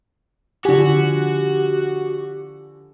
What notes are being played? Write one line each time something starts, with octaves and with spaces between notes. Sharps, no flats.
D3 F3 F#4 G4 G#5